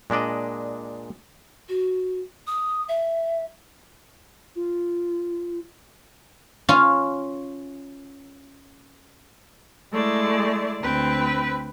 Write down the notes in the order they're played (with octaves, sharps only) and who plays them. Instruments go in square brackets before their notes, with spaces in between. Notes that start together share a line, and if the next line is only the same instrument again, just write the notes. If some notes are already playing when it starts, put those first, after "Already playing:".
[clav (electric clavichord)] A#2 G#3 D4 D5 D#5
[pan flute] F#4
D#6
E5
[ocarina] F4
[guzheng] C#4 F4 C#5
[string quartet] G#3 A3 E4 D5
D2 C4 B4